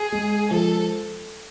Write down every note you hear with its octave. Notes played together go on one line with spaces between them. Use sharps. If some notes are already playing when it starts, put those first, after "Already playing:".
Already playing: G#4
G#3
F3 A4